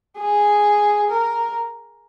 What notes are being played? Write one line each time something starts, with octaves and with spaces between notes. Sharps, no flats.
G#4
A#4